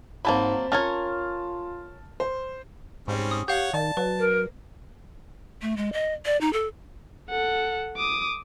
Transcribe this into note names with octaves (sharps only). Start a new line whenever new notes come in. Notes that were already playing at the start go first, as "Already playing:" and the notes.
G#2 F#3 G3 A#3 C4 A5 B5
C#4 F4 A#4 C#5 A5 F6 A6
C5
G#2 G3 C4 C#4
D#6
G4 C#5 F5 F#5 G6
D#3 D5 A5
F#3 B4
A#4
A3
G#3
D#5
D5
D#4
A4
A4 F#5
D6 D#6